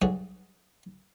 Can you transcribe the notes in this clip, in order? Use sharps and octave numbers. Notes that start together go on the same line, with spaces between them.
B1 G2 G#4 C#5 D5 F#5